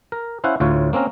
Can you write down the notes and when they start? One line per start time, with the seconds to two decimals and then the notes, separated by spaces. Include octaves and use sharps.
0.12 A#4
0.44 C#4 E4 C5 F5 F#5
0.60 D2 A2 F4 C#5
0.93 A#3 C4 C#4 A#4